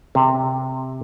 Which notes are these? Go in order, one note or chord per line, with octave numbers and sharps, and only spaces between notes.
C3